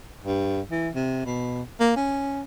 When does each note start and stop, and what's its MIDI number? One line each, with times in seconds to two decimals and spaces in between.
0.24 0.61 43
0.71 0.89 52
0.95 1.23 48
1.25 1.62 47
1.80 1.95 58
1.96 2.42 61